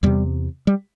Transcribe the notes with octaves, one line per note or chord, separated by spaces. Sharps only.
E2 C3 G3
G3